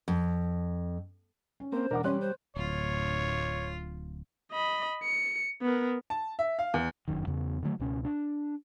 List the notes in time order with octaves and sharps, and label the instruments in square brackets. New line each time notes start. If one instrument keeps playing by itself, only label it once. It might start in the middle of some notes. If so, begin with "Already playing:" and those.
[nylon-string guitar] F2
[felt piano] C#4
[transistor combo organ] A#3 C4 [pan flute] C5
[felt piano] E1 F#5 D6 [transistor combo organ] D4 A#4
[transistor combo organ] G3 [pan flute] C#4 [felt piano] C#5 C6 F#6
[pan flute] C5
[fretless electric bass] D1 [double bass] D2 A2 [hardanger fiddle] F4 [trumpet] C#5
[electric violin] D#5 B5
C#7
B3 A#4
[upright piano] A5
E5
F5
E2
[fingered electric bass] F1 C2 F#2 D#3
E2 C#3 B3
D3 D#3 F#3 A3
C#2 B2 C#4
D4